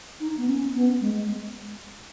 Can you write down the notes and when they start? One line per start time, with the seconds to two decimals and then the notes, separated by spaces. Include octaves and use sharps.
0.20 D#4
0.38 B3
0.47 C#4
0.75 B3
1.01 G#3